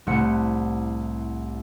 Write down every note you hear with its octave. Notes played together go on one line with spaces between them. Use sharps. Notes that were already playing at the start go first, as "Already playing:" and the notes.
C2 A2 A3 F#5 C#7